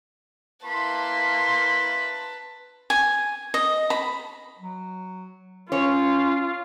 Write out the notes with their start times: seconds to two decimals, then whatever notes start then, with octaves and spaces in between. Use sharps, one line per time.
0.65 A#3 E4 B4 A5 B5 C6
2.90 G#5
3.54 D#5
3.90 B5
4.59 F#3
5.72 C#4 F4 C#5